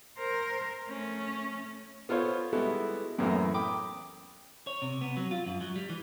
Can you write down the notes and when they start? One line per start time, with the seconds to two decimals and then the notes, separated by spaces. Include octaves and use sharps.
0.17 A#4 C5
0.88 A3 C#4
2.09 B3 F4 A4 C5 C#5
2.53 G3 G#3 B3 E4 F#4 A4
3.18 F#2 A2 E3 F#3 A#3 B3
3.54 G5 B5 D6 D#6
4.67 C#5
4.82 C3
5.01 B3
5.17 F#3
5.31 F4
5.46 F#2
5.61 F#3
5.76 G3
5.89 E3